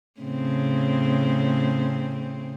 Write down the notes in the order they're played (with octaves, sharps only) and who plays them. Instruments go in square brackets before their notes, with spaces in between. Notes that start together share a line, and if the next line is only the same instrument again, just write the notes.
[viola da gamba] A2 C#3 C4